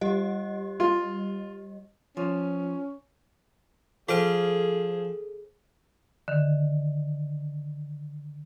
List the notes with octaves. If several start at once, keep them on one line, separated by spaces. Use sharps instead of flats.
G3 G4 D#5
F4
F3 C#4
F3 G#4 A4 C5 G5
D3 D#3